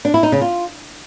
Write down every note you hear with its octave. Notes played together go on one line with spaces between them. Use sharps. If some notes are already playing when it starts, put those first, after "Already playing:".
D4
E4
D#4
C#3
F4